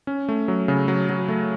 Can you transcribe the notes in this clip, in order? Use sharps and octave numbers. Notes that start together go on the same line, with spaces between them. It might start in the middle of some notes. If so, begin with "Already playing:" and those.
C#4
A3
F#3
C#3
F#3
F#3
A3